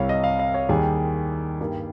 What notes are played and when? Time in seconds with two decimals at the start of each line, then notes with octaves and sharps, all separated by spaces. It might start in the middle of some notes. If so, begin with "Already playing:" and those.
Already playing: C2 C3 G3 C#5 F5
0.09 D#5
0.24 F5
0.39 F5
0.54 C#5
0.69 D#2 D#3 G3 G#4
1.60 G2 D#3 G3 A#3